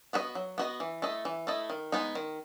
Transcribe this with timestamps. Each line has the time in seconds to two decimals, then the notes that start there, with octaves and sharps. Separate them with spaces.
0.13 B3 F#4 B4 D#5
0.35 F#3
0.58 B3 F#4 B4 D#5
0.80 E3
1.02 A3 E4 A4 D#5
1.25 E3
1.47 A3 E4 A4 D#5
1.70 D#3
1.92 G#3 B3 D#4
2.15 D#3